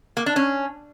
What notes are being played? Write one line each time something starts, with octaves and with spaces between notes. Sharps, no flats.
A#3
D4
C#4